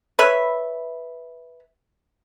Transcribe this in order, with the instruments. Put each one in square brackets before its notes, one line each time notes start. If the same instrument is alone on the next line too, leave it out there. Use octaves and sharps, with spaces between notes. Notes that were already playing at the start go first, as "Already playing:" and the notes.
[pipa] B4 C#5 E5